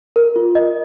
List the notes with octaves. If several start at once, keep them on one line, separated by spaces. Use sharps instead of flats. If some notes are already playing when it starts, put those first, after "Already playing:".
A#4
F4
D#5